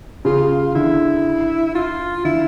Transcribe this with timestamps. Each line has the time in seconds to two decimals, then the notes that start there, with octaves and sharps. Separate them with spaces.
0.25 C#3 F4
0.75 D3 E4
1.75 F4
2.25 D3 E4